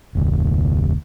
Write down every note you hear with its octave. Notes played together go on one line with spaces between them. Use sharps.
F1 D2